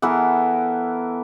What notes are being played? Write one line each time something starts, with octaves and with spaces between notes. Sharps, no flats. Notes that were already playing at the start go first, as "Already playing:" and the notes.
E3 B3 A4 A#4